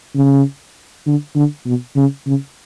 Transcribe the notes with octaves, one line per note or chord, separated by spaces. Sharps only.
C#3
D3
D3
B2
C#3
C#3